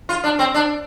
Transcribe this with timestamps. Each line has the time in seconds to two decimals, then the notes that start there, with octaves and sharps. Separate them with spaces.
0.09 F4
0.24 D4
0.39 C4
0.54 D4